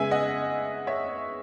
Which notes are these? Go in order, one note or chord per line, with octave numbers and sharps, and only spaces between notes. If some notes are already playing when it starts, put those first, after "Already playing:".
Already playing: C#3 G#3 B3 E5 G#5
D#5 F#5
C#5 E5